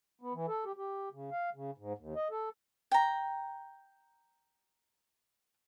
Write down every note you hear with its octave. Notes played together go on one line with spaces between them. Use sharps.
B3
E3
A4
G4
G4
C#3
F5
C#3
G#2
D#2
D#5
A4
G5 A#5